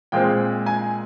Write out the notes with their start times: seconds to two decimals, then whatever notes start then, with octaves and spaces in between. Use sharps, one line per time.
0.12 A#2 G#3 C4 G5
0.66 G#5